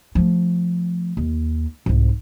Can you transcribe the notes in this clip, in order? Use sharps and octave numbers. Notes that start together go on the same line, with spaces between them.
F3 A3
D#2
C2 G#2